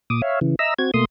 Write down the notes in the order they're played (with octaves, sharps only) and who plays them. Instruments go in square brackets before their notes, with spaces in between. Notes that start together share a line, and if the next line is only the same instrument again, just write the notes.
[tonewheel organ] A#2 D6 D#6
C#5 E5 F5
C#3 E3
D#5 E5 A#5 E6
C4 F#4 G#6
B2 A3 A#3 C6 D#6